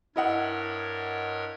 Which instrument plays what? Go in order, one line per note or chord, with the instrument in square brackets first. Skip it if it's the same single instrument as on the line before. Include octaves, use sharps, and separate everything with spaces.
[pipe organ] G2 A#4 C#5 [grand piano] E4 D#5 F#5